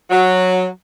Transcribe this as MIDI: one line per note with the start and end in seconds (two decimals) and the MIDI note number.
0.10 0.65 54